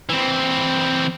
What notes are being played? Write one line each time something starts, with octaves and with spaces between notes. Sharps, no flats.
E3 C4